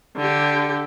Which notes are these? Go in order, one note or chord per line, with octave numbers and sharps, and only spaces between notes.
D3 G4